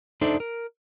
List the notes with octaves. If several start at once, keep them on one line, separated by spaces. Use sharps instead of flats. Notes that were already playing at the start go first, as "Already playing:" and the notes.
D4 D#4 A4 C5 D5 E5
A#4